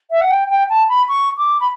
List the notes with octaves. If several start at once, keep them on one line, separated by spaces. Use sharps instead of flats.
E5
F#5
G5
G5
A5
B5
C#6
D6
B5